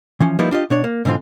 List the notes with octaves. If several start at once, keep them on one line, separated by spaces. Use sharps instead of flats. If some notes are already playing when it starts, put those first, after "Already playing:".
E3 F3 C#4
F3 G3 A#3 D#4 E4 B4
D4 F4 G4 D#5
B2 D4 C#5
A#3
G#2 B2 D3 E3 C4 F4